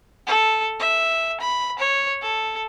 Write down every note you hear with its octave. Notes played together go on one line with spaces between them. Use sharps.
A4
E5
B5
C#5
A4